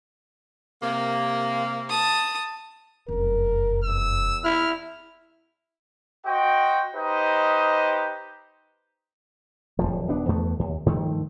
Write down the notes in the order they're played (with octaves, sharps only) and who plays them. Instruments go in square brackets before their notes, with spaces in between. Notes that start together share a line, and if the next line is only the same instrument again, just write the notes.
[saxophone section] C3 A#3
[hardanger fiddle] A5 D#6
[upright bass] F1 F#2 [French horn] A#4
[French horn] E2 [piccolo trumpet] E6
[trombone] E4 [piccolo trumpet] F6
[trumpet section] F#4 C5 D#5 G5
D#4 G4 B4 C5 D#5
[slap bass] D1 G1 F3
D#1 B3 D4
E2 A3 B3
D#2
G2 D#3 F3 A3